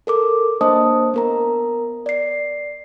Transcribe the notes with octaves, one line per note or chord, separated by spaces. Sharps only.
A4 A#4 D6
A#3 D4 C5 D#5 A5 D#6
B3 A#4 A#5
D5 C7